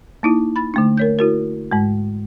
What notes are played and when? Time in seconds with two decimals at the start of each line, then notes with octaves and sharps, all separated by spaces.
0.23 A#3 D#4 E4
0.56 B5 A6
0.74 D3 A3 D4
0.97 A#4 C#5 G6
1.19 E4 F#4 A#4
1.71 G#2 G#3